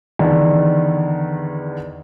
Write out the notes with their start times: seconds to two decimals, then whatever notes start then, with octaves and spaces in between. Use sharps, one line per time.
0.19 E2 D3 D#3